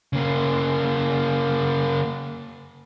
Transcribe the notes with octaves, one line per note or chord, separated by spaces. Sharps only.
C#3 A#3